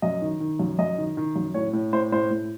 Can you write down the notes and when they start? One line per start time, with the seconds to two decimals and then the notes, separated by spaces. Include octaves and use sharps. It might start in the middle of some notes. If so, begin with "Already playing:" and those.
0.02 F#2 D#5
0.22 D#3
0.40 D#3
0.59 F#2
0.79 F#2 D#5
0.98 D#3
1.17 D#3
1.36 F#2
1.54 A2 C#5
1.73 A2
1.93 A2 C5
2.12 A2 C5
2.31 A2